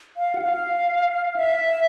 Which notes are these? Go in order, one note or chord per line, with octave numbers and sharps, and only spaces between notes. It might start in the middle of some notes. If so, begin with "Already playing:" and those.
F5
F#5
F5
E5